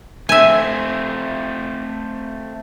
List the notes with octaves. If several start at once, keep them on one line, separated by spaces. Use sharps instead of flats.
A3 C4 E5 G#5